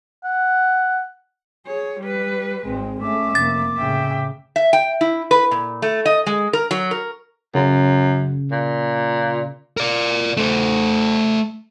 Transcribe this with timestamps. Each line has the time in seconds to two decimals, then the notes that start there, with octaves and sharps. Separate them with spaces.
0.24 F#5
1.66 G#4 C#5
2.00 G3 B4
2.64 G#1 G#3 C4
3.01 A3 C#4 E5 D6
3.35 F1 A#3 A6
3.78 A2 C#3 E5 G5
4.56 E5
4.73 G5
5.01 E4
5.31 B4
5.51 A#2
5.82 A3
6.06 D#5
6.27 G#3
6.53 A#4
6.71 F#3
6.91 A#4
7.55 F#2 C#3
8.51 A#2
9.77 A#4 D5
10.37 A3 C5